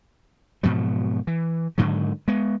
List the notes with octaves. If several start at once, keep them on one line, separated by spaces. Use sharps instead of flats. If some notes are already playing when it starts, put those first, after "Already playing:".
G#2 B2 F3 F#3
E3
G#2 D3 D#3 F#3
G#3 B3